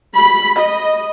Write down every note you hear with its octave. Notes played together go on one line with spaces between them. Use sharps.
B5
D#5